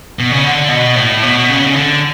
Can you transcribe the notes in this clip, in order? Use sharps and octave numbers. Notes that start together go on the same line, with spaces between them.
B2
C#3
D3
B2
A2
B2
C#3
C#3
D3